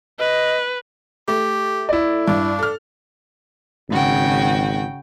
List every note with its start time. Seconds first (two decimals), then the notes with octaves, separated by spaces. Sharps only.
0.19 B4 D#5
1.28 A3 G4
1.89 E4 D5
2.28 G2 D4
2.59 A4 F6
3.89 G#1 C#3 F#4 G5